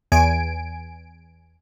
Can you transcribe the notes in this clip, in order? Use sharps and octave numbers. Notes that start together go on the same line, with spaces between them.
E2 G#5 D7